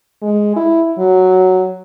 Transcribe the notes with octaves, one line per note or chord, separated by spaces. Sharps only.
G#3
E4
F#3